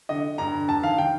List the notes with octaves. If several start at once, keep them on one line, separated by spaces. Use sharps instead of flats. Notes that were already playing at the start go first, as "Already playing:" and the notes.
D3 D#5
D3
G2 A#5
D3
G2 A5
D#3 F5
D#3 G5